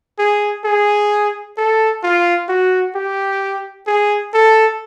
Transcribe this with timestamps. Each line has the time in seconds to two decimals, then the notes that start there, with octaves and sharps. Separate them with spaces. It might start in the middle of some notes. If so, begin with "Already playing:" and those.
0.19 G#4
0.64 G#4
1.57 A4
2.03 F4
2.48 F#4
2.95 G4
3.87 G#4
4.34 A4